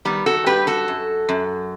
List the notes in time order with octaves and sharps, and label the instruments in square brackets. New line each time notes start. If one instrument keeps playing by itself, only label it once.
[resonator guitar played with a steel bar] D#3 G3 B3
F#4 A4
G2 G4 B4
F#4 A4
F#2
F#2